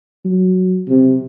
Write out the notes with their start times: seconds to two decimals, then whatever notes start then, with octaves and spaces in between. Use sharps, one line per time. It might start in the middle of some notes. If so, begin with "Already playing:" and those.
0.25 F#3
0.88 C3